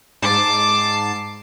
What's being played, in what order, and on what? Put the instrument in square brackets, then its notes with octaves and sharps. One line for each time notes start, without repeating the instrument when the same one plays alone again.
[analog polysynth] G#2 A5 C7 [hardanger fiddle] D6